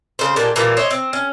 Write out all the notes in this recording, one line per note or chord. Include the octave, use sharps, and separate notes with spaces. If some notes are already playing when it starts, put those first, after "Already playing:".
C#3 C5
A#2 G#3 D4 G4
A#2 E3 G3 A#3
C5 C#5 D#5 E5
C4
C#4